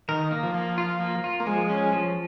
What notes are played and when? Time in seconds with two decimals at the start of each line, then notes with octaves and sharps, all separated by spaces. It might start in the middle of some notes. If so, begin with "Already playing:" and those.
0.09 D#3 A#4
0.31 A#3
0.43 F3
0.54 A#3
0.78 F4
1.00 A#3
1.24 F4
1.40 A#3
1.46 F3 G#3
1.70 C#4
1.93 F3